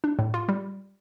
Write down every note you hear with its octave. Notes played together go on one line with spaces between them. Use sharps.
D4
A2
F4
G3